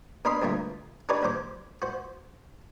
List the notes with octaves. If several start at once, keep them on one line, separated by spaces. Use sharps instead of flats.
B2 D4 A#4 B5 C6 D#6
D2 G2 A#2 A3 A#3
D4 D#4 G4 B4 C#5 D5
D#2 F#3 C5 D6
F#4 C5